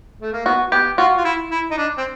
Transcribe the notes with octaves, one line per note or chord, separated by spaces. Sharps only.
A3
A#3
B3 F#4
B3 G4
F4 F#4
F4
E4
E4
D#4
D4
C4